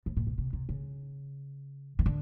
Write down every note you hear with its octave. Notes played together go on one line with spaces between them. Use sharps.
A2
A#2
B2
C3
C3
C#3
D#3
D3